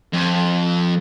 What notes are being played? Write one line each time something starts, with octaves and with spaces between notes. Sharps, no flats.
F2